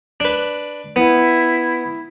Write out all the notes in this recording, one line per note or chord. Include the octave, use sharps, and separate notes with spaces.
D4 B4
B3 E4